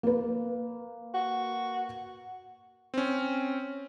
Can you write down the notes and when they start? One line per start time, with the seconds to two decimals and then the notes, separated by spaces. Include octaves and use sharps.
0.03 A#3 B4
1.14 F#4
2.94 C4 C#4